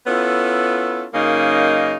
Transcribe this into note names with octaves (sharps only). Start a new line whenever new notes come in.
B3 C#4 E4 F4 A4
F#2 C#3 A#3 D#4